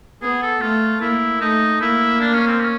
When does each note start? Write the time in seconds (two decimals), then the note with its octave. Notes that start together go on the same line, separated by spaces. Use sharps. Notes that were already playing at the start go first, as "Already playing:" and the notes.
0.22 B3 G#4
0.42 A4
0.61 A3 F4
1.01 A#3 E4
1.41 A3 D#4
1.81 A#3 E4
2.21 D4
2.34 C#4
2.47 C4
2.61 C#4